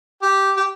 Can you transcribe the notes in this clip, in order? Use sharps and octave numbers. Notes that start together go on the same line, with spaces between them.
G4
G4